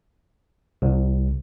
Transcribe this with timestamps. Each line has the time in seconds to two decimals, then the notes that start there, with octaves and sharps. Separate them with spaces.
0.82 C2